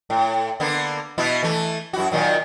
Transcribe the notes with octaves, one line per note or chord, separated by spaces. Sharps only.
A2
D3 A#3 B3
B2 B3 E4
E3 A3
F#2 E4 F#4
A#2 D#3 F#3